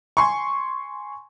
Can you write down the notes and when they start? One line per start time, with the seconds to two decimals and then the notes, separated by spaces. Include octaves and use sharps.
0.17 G#5 C6 C#6